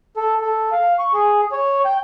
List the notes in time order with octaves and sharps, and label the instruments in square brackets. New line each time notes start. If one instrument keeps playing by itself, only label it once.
[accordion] A4
A4
F5
C#6
G#4
C#5
G5